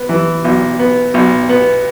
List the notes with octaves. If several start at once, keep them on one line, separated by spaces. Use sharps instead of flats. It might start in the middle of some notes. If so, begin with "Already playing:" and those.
Already playing: B3
E3
B1
B3
B1
B3